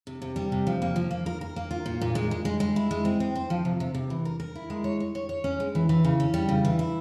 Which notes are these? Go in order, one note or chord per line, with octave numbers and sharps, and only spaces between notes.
C3
C3
G3
C3
F3
A#3
F3
A#3
A#4
A#4
A#3
F4
A#2
A#2
G#3
G#3
G#3
G#3
E4
G#3
C4
C4
C5
F3
C3
C3
C3
E3
A#4
A#4
E4
G#3
C#5
C#5
C#5
C#5
C#4
G#3
E3
E3
C#3
C#4
G3
C#3
E3
E4